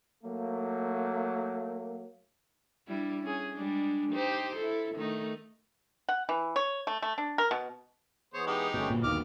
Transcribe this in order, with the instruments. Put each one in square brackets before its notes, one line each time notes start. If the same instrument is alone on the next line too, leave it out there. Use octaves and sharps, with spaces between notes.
[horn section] F#3 A3 A#3
[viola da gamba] G3 D4 E4
C#4 G#4
G3 G#3 D4
D#4 G4 C5
E4 A4
D#3 A3 D#4
[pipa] F#5
E3
C#5
A3
A3
D4
A#4
B2
[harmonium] E3 B3 G#4 [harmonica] C5 C#5
[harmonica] G#3 D#4 G4
[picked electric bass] G1 B2 [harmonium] A3 C#4 G5
[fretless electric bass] A#2
[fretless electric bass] D#2 D#3 [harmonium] A#3 D#5 [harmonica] D6 F6